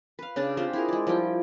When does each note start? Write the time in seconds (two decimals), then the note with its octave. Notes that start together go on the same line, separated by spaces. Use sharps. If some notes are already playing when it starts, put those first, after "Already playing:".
0.19 B4 F5
0.36 C#3 D4 D5 A5
0.57 C4 F4 G4 C5
0.73 E4 G#4 A#4
0.88 G#3 D5
1.07 F3 G3 E4 G5